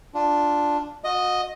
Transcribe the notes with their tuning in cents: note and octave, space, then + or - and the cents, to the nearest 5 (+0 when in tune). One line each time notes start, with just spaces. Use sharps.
D4 +0 F4 +0
F#4 -35 D#5 +0